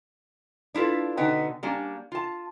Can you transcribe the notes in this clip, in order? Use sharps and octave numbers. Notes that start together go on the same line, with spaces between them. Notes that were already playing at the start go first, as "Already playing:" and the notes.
D4 E4 F4 A4 B4
B2 D3 B3 D#4 B4 G5
G3 A#3 C#4 D4
F4 A5